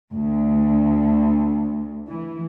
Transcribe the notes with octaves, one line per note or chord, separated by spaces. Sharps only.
D2
E3